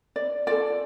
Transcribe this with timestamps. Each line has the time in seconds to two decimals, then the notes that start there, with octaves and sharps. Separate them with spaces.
0.16 D5
0.47 F4 A4 D5